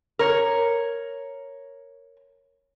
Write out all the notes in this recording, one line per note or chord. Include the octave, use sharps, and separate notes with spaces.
A#4 C#5